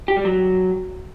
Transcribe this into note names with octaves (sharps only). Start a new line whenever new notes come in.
G4
G3
F#3